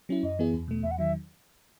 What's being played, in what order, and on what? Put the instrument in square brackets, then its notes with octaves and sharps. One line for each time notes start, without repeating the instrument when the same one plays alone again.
[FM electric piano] F#3 C#4 E4
[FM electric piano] F#2 [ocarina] D#5
[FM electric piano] E3 B3 E4 G#4
E2
B2 A3
[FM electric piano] E2 [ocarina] E5
[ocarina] F#5
[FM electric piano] D#3 F#3 [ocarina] E5